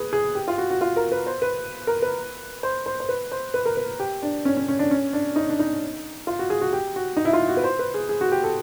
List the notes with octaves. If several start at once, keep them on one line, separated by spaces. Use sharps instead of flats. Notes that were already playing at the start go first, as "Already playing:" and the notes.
Already playing: G#4 B4
G#4
G4
F4
F#4
F#4
F4
A#4
B4
C5
B4
A#4
B4
C5
C5
C5
B4
C5
B4
A#4
B4
G4
D4
C#4
C#4
C#4
D4
C#4
D4
D#4
D4
D#4
F4
F#4
G#4
F#4
G4
F#4
D#4
E4
F4
F#4
B4
C5
B4
G#4
G#4
F#4
G4
A4